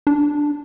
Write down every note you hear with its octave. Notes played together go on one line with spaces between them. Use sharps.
D4